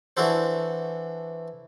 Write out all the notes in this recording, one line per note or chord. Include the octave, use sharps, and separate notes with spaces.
E3 D4 F#4 A4 C5